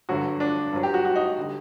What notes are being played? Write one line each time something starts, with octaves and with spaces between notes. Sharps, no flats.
G2 D3 F#3 F#4
D4
G2 F#3
G4
F#4
F#4
D#4
D3 G3